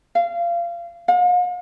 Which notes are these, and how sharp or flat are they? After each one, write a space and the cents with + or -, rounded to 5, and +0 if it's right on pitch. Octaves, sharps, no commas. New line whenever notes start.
F5 -25
F5 +45